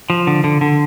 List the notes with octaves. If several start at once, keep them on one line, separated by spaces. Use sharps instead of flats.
F3
D3
D3
D3